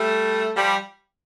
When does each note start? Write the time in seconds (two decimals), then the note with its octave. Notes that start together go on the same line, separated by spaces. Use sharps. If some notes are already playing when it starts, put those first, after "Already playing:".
Already playing: G3 A3
0.56 F3 G3